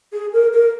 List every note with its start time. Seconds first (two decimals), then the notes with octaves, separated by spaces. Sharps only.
0.13 G#4
0.33 A#4
0.53 A#4